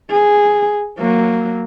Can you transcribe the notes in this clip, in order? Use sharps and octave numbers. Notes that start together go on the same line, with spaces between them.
G#4
F#3 A#3